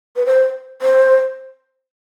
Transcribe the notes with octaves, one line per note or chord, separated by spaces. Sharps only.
B4
C5
C5